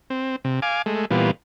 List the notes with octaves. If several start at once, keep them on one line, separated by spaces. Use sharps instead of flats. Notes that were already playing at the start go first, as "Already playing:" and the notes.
C4
C3
F5 G#5 D6
G#3 A3
A#2 E3 G3 B3 F4